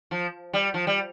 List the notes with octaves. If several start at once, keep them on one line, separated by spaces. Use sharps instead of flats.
F3
G3
F3
G3